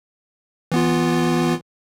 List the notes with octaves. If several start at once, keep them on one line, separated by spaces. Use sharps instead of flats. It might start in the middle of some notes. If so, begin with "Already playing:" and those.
E3 B3 F4